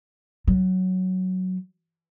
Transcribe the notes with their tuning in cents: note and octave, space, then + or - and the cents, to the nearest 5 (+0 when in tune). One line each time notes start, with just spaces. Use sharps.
F#3 +5